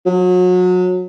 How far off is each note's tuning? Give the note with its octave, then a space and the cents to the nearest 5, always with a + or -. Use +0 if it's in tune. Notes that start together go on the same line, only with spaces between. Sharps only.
F#3 -30